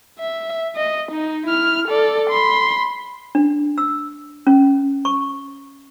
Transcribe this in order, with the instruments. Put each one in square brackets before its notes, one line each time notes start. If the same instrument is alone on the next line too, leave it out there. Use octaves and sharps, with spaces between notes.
[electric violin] E5
D#5
D#4
E4 F6
A4 D5
B5 C6
[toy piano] D4
E6
C#4
C#6